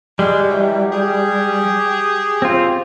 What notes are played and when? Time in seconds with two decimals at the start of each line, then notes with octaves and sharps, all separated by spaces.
0.19 G3 G#3
0.49 E3 F#3
0.93 G4 G#4
2.42 C4 F4